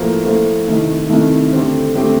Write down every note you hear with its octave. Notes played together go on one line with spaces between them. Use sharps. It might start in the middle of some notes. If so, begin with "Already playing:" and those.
Already playing: A2 F3 A#3 F4 C5
A2 F3 A#3 F4 C5
C2 C3 D#3 A3
C2 C3 D#3 A3
D3 A3 C4 G4 C5
D3 A3 C4 G4 C5